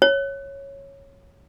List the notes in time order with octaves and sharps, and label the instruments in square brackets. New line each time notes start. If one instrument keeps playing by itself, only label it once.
[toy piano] C#5